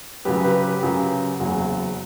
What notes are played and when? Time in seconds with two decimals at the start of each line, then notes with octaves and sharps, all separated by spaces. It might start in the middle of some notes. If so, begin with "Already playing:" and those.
0.25 F#2 C#3 F#3 G4 B4
0.44 G4 B4
0.63 G4 B4
0.82 F#2 C#3 F#3
1.40 F#1 E2 C#3 F#3